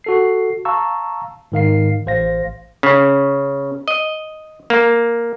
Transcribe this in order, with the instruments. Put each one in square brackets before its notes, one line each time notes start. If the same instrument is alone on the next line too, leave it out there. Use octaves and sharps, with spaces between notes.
[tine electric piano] F#4 A4 C7
F5 A5 A#5 C#6 E6
G#2 D#3 F5 C7
A1 C5 F5 A#6
[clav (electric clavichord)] C#3
D#5
A#3